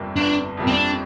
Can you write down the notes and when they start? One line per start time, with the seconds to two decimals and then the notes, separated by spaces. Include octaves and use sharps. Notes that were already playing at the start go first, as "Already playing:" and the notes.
Already playing: G1 F2 C3 G3 A#3
0.16 G1 D4
0.57 F2 C3 G3 A#3
0.67 C4
0.71 D4